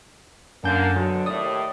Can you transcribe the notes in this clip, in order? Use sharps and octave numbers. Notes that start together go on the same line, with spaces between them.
F#2 D3 A#3 G#5 G6
B2 D3 F#3
D#2 A2 D5 D#6